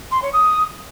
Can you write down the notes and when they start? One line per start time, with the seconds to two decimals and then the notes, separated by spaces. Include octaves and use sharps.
0.11 C6
0.22 C#5
0.33 D#6